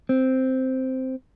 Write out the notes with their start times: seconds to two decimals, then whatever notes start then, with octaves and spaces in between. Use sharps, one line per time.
0.09 C4